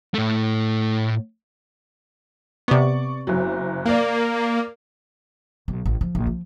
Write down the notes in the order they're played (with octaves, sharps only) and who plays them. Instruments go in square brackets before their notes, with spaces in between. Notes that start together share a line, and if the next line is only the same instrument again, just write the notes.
[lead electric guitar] A2 A3
[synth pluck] C3 B3 [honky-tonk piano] D5 C#6
[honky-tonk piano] F#1 F#3
[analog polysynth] A#3 [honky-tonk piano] A#4 D5
[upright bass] B1
A1
F3
A#1
F3